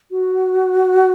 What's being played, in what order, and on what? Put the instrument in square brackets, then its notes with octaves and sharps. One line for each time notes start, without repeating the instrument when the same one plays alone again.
[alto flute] F#4